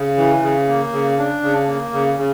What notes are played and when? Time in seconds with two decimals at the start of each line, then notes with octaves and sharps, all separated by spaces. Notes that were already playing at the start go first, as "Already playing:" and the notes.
Already playing: C#3
0.17 E3
0.42 C#3
0.68 A#3
0.93 C#3
1.18 D4
1.43 C#3
1.68 A#3
1.93 C#3
2.18 C#3